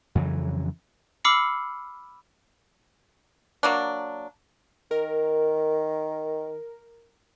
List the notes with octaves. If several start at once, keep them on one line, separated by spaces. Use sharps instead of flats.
F2 C#3 E3 F#3
B5 D6 E6 F6 C7 C#7
F#3 A#3 D4
D#3 A#4